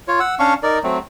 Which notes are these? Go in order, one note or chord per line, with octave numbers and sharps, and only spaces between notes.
F4 C#5
F#5 E6
C#4 D4 F5 C#6
D#4 A#4 D5
F#3 A3 C4